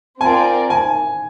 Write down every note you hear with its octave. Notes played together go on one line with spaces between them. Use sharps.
C4 F4 A#4 D5 G#5
G#5